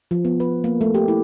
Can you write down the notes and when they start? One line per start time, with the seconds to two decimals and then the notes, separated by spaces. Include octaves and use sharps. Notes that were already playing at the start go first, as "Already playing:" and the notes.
0.11 F3
0.25 B3
0.40 B4
0.64 A#3
0.81 A3
0.95 G4
1.08 E4